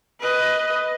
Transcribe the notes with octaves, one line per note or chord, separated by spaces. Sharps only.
B4 D#5